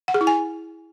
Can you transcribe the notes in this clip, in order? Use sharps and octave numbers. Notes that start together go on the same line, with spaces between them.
F#5
G#4
E4
G#5